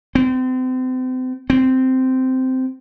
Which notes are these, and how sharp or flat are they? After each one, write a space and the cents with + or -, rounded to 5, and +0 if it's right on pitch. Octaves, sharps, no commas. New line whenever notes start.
C4 -35
C4 -10